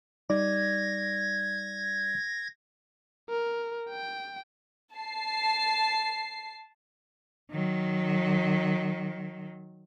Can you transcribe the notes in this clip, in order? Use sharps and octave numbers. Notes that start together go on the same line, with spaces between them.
G3 D#4 D5 G#6 A#6
A#4
G5
A5 C7
D#3 F#3